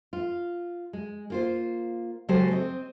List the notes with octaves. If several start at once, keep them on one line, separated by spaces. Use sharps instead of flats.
F4
G#3
A#3 F4 C5
C#3 F#3 G#3 G4 A4 C5
C4 D#5